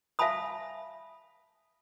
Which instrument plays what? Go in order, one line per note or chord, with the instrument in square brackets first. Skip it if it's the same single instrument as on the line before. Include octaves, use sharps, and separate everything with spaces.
[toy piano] E5 F5 G#5 A5 B5 D#6